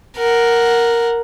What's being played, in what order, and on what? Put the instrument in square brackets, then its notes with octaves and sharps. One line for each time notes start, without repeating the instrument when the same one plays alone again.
[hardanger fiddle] A#4 F#5